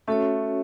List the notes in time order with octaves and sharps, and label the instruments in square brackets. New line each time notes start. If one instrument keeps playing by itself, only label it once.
[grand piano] A3 [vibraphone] C#4 F#4 A4 C#5